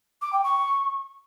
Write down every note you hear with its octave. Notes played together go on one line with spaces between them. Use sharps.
D6
G5
C#6